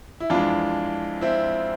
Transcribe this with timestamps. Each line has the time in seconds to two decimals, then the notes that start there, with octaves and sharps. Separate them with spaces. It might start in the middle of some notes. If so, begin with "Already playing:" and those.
0.20 E4
0.30 F2 E3 G#3 D4 F4
1.21 C4 E4